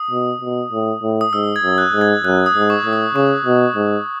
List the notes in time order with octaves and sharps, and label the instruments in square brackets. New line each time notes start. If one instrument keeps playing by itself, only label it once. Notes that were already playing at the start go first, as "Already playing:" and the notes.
Already playing: [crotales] D#6
[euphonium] B2
B2
A2
A2
[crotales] D#6
[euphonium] G#2 [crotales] E6
[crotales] G#6
[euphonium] F#2
[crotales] F#6
[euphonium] G#2
[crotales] G#6
[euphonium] F#2 [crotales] F#6
[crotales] D#6
[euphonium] G#2
[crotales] C#6
[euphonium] A2
[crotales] D#6
[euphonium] C#3 [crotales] C#6
[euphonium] B2
G#2